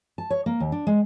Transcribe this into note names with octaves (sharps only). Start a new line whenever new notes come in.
A5
C#5
A#3
D#2
D4
G#3